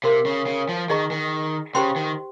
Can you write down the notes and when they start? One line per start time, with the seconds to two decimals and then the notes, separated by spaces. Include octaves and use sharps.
0.04 C3 A#4 F5 C6
0.26 C#3
0.47 C#3
0.69 F3
0.89 D#3 D#4 G#4 D#5 A#5 C#6
1.11 D#3
1.75 C#3 G4 C5 G5 C6
1.96 D#3